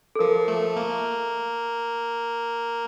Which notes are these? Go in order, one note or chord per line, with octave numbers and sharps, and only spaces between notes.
A4
F3 A#4
A3
A#3